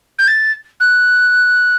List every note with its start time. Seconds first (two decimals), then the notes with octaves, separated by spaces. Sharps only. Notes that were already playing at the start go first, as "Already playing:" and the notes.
0.18 G6
0.27 A6
0.80 F#6